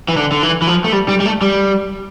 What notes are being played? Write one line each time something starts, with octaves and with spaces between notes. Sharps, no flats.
E3
D3
D3
E3
E3
F3
A3
G3
G3
G3
A3
G3